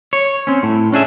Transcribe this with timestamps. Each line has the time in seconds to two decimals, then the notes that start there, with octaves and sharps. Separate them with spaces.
0.13 C#5
0.47 C4 C#4
0.63 A2
0.92 C#4 D4 G#4 E5